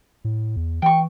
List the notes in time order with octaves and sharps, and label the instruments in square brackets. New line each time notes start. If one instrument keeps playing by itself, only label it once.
[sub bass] A2
E2
[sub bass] E3 [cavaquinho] G5 C#6